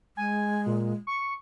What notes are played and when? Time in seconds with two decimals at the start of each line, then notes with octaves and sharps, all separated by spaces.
0.17 G#3 G#5
0.66 A#2
1.07 C#6